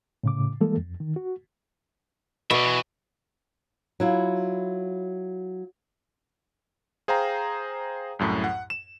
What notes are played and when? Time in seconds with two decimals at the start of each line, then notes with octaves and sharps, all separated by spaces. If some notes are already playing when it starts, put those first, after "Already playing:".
0.24 A2 C#3 D6
0.61 E3 G3 G#3 A#3 A4
0.78 F2
1.00 D#3
1.16 F#4
2.51 B2 D5 E5
2.65 E3
4.00 F#3 E4 F4
7.08 G#4 C5 F5 G5 A#5
8.19 C2 F#2 A2
8.44 F#5
8.70 E7